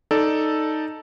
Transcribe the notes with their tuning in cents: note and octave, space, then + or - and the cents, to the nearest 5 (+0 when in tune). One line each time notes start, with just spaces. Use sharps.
D#4 +0 A4 +0 D5 -5